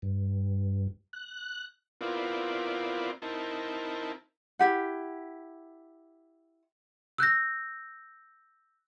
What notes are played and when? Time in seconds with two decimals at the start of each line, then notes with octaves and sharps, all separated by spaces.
0.02 G2
1.13 F#6
2.01 B3 C4 E4 F4 A#4 D5
3.22 C4 D#4 E4 A#4 A5
4.59 E4 G4 F#5
7.18 E6 F#6 G6 A#6